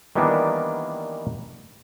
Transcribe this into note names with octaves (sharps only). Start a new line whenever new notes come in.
D#3 E3 G3 A#3 B3 D4